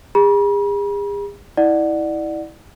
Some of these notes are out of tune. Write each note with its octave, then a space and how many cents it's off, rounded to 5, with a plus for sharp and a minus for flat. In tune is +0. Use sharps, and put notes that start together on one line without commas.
G#4 -45 B5 -45
E4 -25 D5 +20 F#5 +0